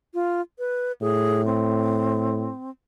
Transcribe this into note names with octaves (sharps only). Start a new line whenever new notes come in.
F4
B4
A2 G#4
C4